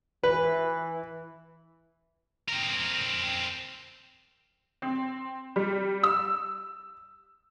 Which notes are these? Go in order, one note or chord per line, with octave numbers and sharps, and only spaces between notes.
E3 B4
C4 A#4
C4
G3
E6